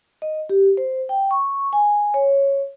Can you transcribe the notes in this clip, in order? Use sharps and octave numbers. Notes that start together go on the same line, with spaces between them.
D#5
G4
C5
G5
C#6
G#5
C#5